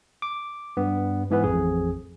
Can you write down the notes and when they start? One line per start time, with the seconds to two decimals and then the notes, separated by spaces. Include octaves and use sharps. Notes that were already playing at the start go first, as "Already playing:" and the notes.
0.22 D6
0.77 G2 B3
1.30 G#2 E3 B3 B4
1.44 A1 F2 G#4